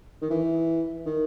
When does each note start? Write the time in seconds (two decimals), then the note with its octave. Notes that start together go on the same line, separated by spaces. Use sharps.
0.22 D#3
0.30 E3
1.06 D#3